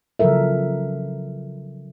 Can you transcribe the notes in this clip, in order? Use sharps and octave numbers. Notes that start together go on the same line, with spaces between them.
C#3 F3 F#3 A4 A#4 E5